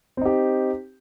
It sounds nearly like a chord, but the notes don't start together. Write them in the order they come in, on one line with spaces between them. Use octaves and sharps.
C4 D#4 G4